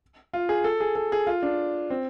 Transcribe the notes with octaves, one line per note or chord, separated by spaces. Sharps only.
F4
G#4
A4
G#4
A4
G#4
F4
D4
C4